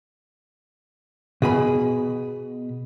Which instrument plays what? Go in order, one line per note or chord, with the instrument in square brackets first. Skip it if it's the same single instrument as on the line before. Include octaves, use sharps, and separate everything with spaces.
[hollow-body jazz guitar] B2 G#4 B5